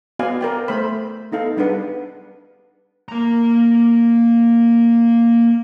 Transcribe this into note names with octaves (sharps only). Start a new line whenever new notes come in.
B3 F#4 D5 F5 G#5
A#4 D5 G5
A3 C5 B5
B3 D#4 A4 F5
G3 D4 G#4 B4 F#5
A#3 A#5